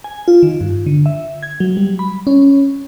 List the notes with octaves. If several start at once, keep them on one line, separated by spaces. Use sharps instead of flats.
G#5
F4
D#3
G2
D3
E5
G#6
F#3
G3
B5
C#4